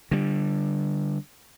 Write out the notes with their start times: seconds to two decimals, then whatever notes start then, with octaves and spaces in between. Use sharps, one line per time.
0.11 D3 G3